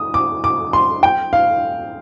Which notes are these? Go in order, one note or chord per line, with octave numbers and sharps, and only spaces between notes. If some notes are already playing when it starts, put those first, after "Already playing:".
Already playing: D#6
D6
D6
C6
G5
F5